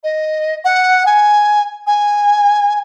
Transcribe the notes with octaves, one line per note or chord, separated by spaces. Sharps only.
D#5
F#5
G#5
G#5